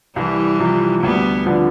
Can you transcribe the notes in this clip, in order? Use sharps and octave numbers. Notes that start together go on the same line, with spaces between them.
C2 E3 G3
C3 F3
D2 G3 B3
D3 F3 B3 D4